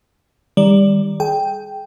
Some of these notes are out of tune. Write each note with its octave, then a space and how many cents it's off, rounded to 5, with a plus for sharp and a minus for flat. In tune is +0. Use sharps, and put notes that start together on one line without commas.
D#3 +0 G3 +25 D5 -10
G#4 +30 G5 +0